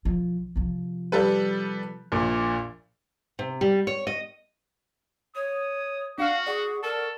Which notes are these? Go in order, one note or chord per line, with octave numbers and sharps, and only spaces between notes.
B1 F3
C3 F3
G3 A4 B4
A#1 A#2
C3
G3
C#5
D#5
C#5 D#6
D4 F#4 F5 F#5 F6
G#4 D5 F#5 C#6
A4 A#4